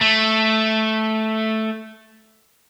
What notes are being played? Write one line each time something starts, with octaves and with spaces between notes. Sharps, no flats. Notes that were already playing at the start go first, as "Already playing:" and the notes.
A3